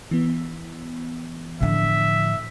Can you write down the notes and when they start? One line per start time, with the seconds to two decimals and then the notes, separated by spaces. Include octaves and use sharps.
0.11 E3 B3
1.61 A2 D3 F3 E5